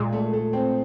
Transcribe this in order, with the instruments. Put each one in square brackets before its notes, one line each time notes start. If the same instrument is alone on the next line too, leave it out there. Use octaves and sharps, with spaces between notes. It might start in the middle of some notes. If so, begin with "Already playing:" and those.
Already playing: [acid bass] A#2 [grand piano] G#3 G#4
[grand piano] A3 A4
A3 A4
C4 C5